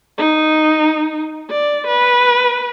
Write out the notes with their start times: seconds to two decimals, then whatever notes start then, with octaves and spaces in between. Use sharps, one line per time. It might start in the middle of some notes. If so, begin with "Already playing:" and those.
0.18 D#4
1.50 D5
1.88 B4